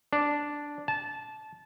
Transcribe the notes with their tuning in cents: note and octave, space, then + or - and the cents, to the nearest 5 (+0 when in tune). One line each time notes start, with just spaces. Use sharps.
D4 -5
A5 -20